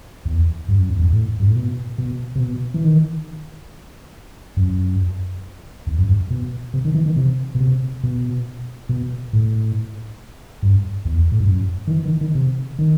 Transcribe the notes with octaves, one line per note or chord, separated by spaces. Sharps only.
E2
G2
F#2
E2
F#2
A2
G2
A2
B2
B2
C3
B2
E3
D#3
F#2
E2
F#2
G2
B2
C3
D#3
E3
D#3
C3
B2
C3
B2
B2
A2
G2
E2
A2
G2
F#2
D#3
E3
D#3
D#3
C3
D#3